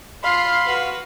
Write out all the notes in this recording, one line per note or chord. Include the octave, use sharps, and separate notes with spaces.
F4 F5 B5 C6
F#4 B4